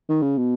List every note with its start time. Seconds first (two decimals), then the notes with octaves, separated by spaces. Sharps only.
0.09 D#3
0.22 C#3
0.37 B2